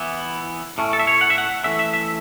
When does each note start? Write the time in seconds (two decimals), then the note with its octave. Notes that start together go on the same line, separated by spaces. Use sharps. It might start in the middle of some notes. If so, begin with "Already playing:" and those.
Already playing: E3 B3 E4
0.78 A2 A3 C#4
0.93 A4
0.99 E5
1.07 C#5
1.21 F#5
1.30 E5
1.38 F#5
1.64 E3 A3 C#4 E5
1.79 E5
1.94 E5